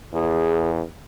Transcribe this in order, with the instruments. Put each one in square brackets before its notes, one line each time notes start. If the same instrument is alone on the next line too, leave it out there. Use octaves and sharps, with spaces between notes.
[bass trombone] E2 [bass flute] G#4